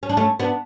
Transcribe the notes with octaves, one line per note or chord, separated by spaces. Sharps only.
C#4
D4
A3 C#4
B3 D4